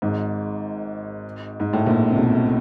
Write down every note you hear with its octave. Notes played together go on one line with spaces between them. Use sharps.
G#1 G#2
G#2
A2
A#1 A#2
C3
B1 B2